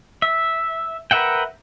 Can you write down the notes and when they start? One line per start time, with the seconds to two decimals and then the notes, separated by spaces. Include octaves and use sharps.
0.22 E5
1.11 A#4 B4 E5 F#5 G5